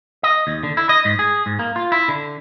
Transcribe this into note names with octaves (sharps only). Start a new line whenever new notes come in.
D#5
D#2
D3
E4
D#5
G#2
G#4
G#2
A#3
F4
E4
D3